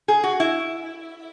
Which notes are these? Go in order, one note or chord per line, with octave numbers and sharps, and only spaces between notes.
G#4
F#4
E4